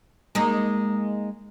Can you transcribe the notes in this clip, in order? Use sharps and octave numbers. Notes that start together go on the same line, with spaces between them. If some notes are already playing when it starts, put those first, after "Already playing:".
G#3 A#3 D#4